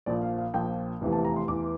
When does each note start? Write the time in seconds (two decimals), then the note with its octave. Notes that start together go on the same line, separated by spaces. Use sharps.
0.06 A#1 A#2 F3 D5
0.22 F5
0.38 F5
0.54 A#1 A#2 F3 G5
1.01 F1 E2 C3 E3
1.12 A5
1.25 A#5
1.36 C6
1.48 E2 E3 D6